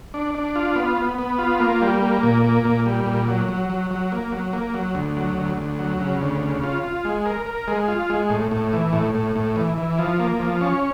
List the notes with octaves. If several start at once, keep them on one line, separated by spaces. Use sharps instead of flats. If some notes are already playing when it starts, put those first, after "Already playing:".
D4
D4
F4
B3
B3
B3
F4
A#3
G3
A#3
A#2
A#3
A#2
G3
A#2
F#3
F#3
F#3
F#3
A#3
F#3
A#3
F#3
D2
F#3
D2
D2
F#3
C#3
D2
C#3
F4
F4
G#3
A#4
A#4
G#3
F4
G#3
A2
A2
E3
A2
A2
A2
E3
E3
F3
A#3
F3
C#4